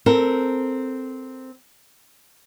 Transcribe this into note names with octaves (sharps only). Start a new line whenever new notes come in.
C4 A4 A#4